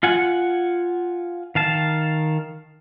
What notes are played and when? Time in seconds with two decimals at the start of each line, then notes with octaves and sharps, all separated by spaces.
0.03 F4 F#5 G#5
1.55 D#3 F5 A5